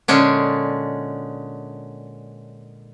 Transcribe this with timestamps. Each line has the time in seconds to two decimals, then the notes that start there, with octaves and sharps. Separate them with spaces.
0.08 A#2 D3 G#3 C#4 D4